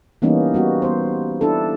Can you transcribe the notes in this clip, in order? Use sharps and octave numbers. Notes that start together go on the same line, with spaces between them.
E3 G3 A#3 B3 C#4 D#4
G3 B3 F#4
B3 C5
D4 E4 A4